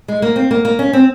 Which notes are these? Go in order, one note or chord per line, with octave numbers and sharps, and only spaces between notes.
G#3
A#3
C4
A#3
A#3
C#4
C4